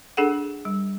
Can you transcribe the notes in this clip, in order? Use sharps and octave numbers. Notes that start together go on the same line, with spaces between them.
D4 G#4 A4 F#5
G3